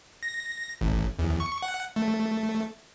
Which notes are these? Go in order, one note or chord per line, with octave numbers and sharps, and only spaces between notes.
A#6
A1
E2
C#6
F#5
A3